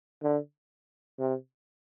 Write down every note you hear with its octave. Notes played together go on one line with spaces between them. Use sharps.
D3
C3